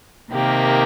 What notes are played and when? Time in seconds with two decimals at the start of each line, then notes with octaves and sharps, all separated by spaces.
0.32 C3 D#3 A#3 G4